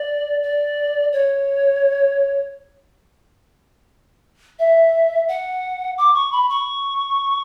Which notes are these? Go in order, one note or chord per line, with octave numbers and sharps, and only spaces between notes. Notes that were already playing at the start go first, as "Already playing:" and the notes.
Already playing: D5
D5
C#5
E5
F#5
D6
C#6
B5
C#6